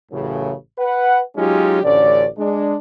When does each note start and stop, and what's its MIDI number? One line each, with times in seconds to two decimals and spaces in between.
0.12 0.52 33
0.12 0.52 42
0.12 0.52 45
0.12 0.52 49
0.79 1.19 71
0.79 1.19 78
1.36 1.83 54
1.36 1.83 56
1.36 1.83 61
1.36 1.83 63
1.36 1.83 65
1.36 1.83 67
1.84 2.26 33
1.84 2.26 38
1.84 2.26 50
1.84 2.26 61
1.84 2.26 74
2.38 2.76 56
2.38 2.76 62